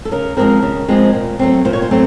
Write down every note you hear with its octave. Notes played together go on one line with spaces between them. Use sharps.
A4
C#3 A#4
F3 G#3 C4 A#4
C#3
F3 G#3 C4
A#2
F#3 A3 C4
A#2 C5
C#5
C5
F#3 A3 C4